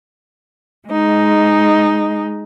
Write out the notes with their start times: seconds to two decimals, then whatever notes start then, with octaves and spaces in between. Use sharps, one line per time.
0.89 G#3 D#4